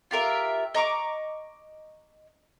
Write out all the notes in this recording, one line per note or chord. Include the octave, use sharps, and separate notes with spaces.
F4 G4 A#4 E5
D#5 A#5 C#6 D6